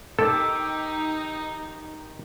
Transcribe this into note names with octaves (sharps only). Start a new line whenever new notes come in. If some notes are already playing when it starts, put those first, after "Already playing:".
D#3 D#4 G4 A4 D6 E6